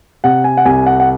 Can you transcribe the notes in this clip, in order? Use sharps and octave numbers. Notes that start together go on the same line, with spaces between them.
C3 F#5
G#5
F#5
C2 G#5
F#5
F#5